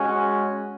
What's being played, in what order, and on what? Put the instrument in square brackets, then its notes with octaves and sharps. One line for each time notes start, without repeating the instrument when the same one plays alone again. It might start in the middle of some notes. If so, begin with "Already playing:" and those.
Already playing: [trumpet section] G#3 C#4 F#4